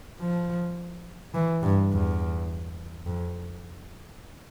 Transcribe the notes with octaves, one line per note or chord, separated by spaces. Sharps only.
F3
E3
G2
E2
F2